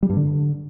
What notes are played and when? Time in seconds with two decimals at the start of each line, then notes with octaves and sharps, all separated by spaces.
0.03 G3
0.10 G2
0.17 D3